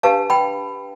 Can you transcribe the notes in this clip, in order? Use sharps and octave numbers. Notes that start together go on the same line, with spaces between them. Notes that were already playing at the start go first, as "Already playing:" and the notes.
D4 G4 B4 F5 A5
G5 B5